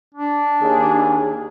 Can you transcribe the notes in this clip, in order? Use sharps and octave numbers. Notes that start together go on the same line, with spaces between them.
D4
D#2 G#4